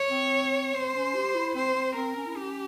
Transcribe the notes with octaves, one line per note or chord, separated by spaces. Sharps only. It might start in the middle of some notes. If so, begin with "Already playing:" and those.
Already playing: C#5
C4
C4 C5
C#4
G4
E4
C4 C5
C4
C4 A#4
C#4
E4
C#4 G4